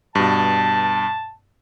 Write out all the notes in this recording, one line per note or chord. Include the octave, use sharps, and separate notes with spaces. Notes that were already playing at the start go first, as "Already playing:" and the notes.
G2 B2 A5